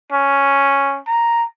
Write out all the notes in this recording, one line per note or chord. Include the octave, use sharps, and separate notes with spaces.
C#4
A#5